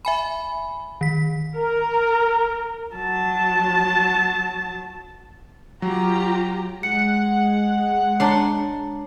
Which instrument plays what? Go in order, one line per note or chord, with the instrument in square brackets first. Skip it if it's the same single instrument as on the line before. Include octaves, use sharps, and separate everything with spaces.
[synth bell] E5 G#5 B5
D#3 B6
[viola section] A#4
[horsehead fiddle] F#3 A5
[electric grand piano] F#3 [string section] F4 G4 A#5
[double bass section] G#3 [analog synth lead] F#5 [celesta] C#7
[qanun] D4 C6 [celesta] C#5 A5 A#5